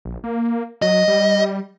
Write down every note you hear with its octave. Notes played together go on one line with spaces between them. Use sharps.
A#1
A#3
F#3 D#5
G3